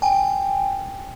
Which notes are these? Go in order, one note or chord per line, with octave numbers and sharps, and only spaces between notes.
G5 G#5